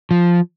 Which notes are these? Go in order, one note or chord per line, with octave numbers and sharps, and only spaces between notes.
F3